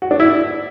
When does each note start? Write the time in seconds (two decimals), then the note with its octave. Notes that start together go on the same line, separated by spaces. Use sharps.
0.02 F#4
0.11 D4
0.20 E4